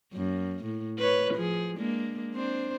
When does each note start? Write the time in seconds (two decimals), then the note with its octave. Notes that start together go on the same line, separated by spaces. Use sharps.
0.13 F#2 A#3
0.64 A2
0.99 B4 C#5
1.34 F3 G#4
1.77 G#3 A#3 D4
2.33 C4 D4 C5